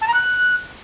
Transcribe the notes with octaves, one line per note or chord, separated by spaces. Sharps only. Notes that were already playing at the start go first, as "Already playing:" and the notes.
A5
A#5
F#6